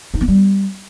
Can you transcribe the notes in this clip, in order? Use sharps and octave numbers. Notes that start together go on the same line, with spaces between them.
D#4
A#3
G3